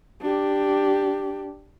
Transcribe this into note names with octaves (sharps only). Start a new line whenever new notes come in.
D4 G4